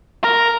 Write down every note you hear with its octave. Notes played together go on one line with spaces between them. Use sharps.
A#4